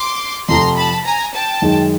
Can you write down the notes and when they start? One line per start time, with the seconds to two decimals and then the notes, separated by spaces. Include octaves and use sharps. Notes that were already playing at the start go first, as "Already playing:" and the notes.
Already playing: C6 D6
0.48 F2 C3 F3 A3 A#5 C6
0.76 A5 B5
1.05 G#5 A#5
1.33 G5 A5
1.62 F#2 D#3 G#3